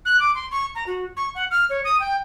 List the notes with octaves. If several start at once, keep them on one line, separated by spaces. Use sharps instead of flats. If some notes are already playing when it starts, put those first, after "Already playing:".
F#6
D6
C6
C#6
A#5
F#4
C#6
F#5
F6
C#5
D#6
G5